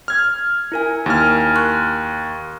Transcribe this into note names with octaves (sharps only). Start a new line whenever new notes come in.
F6 G#6
E4 A#4 G#5
D#2 F6
C6 C#6 F#6